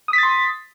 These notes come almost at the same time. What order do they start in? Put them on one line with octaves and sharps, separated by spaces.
D#6 B6 A6 C6